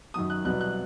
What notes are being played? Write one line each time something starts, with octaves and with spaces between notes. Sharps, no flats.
F#2 D#3 F#3 D#6
F#6
C2 B2 F#3 B3 F#6
F#6